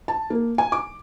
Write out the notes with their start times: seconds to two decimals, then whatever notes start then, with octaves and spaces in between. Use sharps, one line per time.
0.08 A5
0.30 A#3
0.58 G#5
0.72 D6